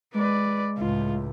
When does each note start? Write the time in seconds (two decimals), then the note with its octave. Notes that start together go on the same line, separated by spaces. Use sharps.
0.14 G#3 B4 D5
0.78 C#2 A2 F4